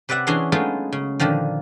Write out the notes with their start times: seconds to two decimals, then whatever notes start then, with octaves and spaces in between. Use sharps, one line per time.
0.09 C3 B4 D5 E5 F#5
0.27 E3 C#4 D4 G#4 F#5 C6
0.52 F#3 G#3 A3 B3 D#4 F4
0.92 C#3
1.20 A#2 D3 D#3 F3